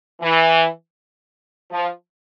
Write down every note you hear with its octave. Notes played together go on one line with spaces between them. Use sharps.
E3
F3